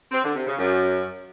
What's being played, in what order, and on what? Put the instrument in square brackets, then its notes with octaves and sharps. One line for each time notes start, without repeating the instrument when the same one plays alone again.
[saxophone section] C4
D3
C3
C#3
F#2